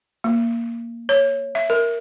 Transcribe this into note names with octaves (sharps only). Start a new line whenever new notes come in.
A#3
C#5
E5
A#4